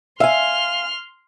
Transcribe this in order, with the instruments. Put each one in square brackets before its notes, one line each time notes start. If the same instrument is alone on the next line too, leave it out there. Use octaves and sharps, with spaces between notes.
[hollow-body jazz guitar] E5 [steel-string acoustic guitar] F5 G#5 [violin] C6 F6